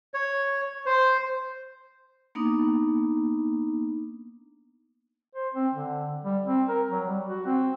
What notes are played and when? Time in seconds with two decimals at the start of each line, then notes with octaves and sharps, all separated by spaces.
0.14 C#5
0.86 C5
2.35 A#3 B3 D4 D#4
5.35 C5
5.54 C4
5.74 D3
6.24 G3
6.46 C4
6.69 A#4
6.91 F#3
7.08 G3
7.28 F#4
7.46 C4